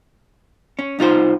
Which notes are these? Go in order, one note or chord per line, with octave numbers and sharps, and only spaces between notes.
C#4
C2 D#4 F4 C5